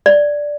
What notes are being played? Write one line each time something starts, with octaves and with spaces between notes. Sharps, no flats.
D5